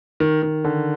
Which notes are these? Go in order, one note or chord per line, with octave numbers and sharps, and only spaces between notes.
D#3
D#3
D3